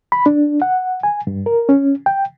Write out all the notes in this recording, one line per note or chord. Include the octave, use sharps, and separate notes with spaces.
B5
D4
F#5
G#5
G2
A#4
C#4
G5